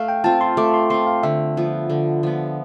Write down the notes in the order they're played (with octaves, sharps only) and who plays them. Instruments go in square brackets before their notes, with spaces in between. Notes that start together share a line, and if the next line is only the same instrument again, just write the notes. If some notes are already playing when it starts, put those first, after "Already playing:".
Already playing: [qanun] A3 [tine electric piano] F5
[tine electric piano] G5
[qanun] C4 F4 [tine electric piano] A5
[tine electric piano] C6
[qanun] A3 [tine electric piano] D6
[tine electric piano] C6
[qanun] C4 F4 [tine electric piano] C6
[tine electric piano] F5
[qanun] D3 [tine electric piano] E5
[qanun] F3 B3
D3
F3 B3